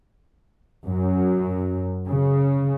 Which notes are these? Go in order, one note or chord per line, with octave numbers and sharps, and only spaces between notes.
F#2
C#3